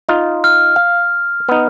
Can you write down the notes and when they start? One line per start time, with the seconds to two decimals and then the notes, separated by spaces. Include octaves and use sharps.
0.09 D#4 F4
0.44 F6
0.76 F5
1.49 B3 D#4